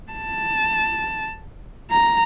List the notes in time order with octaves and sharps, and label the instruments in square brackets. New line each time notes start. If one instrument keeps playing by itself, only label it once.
[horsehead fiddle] A5
A#5